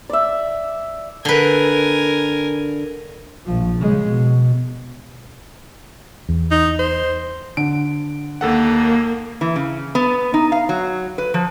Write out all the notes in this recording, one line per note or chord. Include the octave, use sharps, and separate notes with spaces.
D5 E5
D3 A#4 B4 G#5
A#1 F3
C#3 G#3
B2
E2
D#4
C5
D3 D7
D#2 A#3 A4 F#5
E3
C#3
B3
D#4
F5
F#3
B4
F3